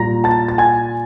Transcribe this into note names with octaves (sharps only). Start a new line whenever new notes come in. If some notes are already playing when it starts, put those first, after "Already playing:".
Already playing: A#2 G3 A#5 A#6
A5 A6
A6
G#5 G#6